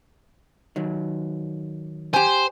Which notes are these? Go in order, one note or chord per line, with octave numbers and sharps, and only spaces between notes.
D#3 F#3
G4 C5 G#5